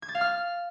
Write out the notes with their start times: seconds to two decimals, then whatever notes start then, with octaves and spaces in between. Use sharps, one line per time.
0.02 G#6
0.09 A6
0.15 F5
0.21 F6